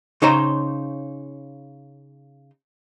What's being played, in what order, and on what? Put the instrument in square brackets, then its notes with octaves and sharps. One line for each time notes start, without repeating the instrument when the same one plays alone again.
[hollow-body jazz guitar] C#3 D#4 C5 C#5 A#5